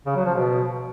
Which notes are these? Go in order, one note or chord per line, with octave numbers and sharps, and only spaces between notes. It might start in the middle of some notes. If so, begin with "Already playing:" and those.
C#3
F#3
F3
B2